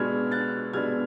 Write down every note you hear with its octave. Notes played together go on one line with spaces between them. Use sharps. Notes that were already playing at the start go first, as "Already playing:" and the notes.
Already playing: B2 G#3 B3 D4 F6 G#6
F#6 A6
B2 G#3 B3 D4 F6 G#6